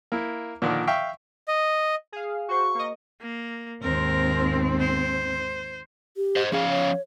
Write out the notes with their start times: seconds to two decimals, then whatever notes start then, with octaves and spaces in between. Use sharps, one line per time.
0.12 A#3 E4
0.62 A#2 D3 D#3 F3
0.87 E5 F5 G5 C#6
1.48 D#5
2.12 G#4 F5
2.48 F#4 C5 C#6
2.75 A#3 D#5
3.21 A#3
3.83 D#2 G#2 C4 A#4
4.80 C5
6.17 G4
6.36 C5 D#5
6.52 F3 C#4 G#4 F5
6.70 C#5